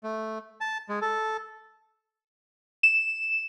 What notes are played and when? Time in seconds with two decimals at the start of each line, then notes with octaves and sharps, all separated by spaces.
0.04 A3
0.61 A5
0.89 G#3
1.01 A4
2.83 E7